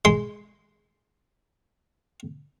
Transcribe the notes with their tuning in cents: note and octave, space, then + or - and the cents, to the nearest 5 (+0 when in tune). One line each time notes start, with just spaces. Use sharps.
G#3 +0 C6 -5